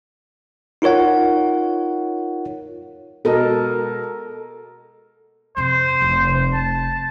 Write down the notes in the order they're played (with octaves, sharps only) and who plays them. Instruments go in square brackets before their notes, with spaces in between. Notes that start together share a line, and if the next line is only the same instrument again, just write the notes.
[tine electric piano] D#4 F4 A#4 C#5 F#5
[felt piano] B2 G#3 D#5 [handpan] A4 A#4
[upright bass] F2 C3 [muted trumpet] C5
[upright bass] F1 F2
[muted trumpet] A5